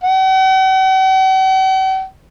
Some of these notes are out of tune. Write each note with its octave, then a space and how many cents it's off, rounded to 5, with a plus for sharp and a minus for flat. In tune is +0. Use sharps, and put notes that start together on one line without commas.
F#5 +45